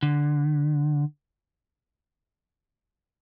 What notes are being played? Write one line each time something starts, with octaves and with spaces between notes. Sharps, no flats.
D3